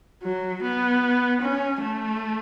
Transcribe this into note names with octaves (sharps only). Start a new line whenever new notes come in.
F#3
B3
C#4
A3